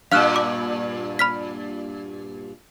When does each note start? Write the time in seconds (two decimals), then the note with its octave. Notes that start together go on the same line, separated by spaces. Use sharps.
0.12 G2 A#2 F5 F6 F#6
0.36 D6
1.19 B5 F6 B6